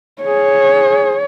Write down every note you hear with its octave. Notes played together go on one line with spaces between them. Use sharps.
G#4 C#5